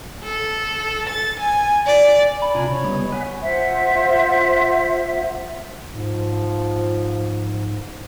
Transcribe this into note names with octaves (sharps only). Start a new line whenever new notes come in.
A4
A6
G#5
D5
B5
C3 D4 F4 G#5 A#5
C#3 C#5
G3 B3 D#5
F#5 G#5 B5
F4 C5 E5 F#5
G#2 F3